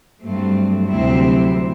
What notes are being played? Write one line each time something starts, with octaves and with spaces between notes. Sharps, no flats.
G2 F#3 A3 C4
D2 C3 F#3 C4 E4